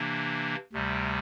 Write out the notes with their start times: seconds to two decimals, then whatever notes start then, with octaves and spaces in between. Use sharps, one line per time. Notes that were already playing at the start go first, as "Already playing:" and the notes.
Already playing: C3 E3 A#3 D4
0.73 D2 C3 G3